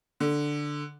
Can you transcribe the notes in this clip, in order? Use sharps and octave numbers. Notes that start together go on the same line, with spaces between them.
D3